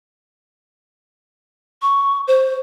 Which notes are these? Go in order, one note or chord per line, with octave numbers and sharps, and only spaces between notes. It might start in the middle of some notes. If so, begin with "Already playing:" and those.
C#6
C5